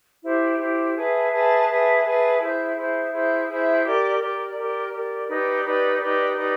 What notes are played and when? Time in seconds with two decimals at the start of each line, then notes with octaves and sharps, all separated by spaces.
0.23 E4 G4 C5
0.60 E4 G4 C5
0.95 G#4 B4 E5 A5
1.32 G#4 B4 E5 A5
1.68 G#4 B4 E5 A5
2.04 G#4 B4 E5 A5
2.39 E4 G#4 C5 E5
2.76 E4 G#4 C5 E5
3.12 E4 G#4 C5 E5
3.48 E4 G#4 C5 E5
3.84 G4 A#4 D5
4.20 G4 A#4 D5
4.56 G4 A#4 D5
4.92 G4 A#4 D5
5.28 D#4 G4 B4 D5
5.64 D#4 G4 B4 D5
6.00 D#4 G4 B4 D5
6.36 D#4 G4 B4 D5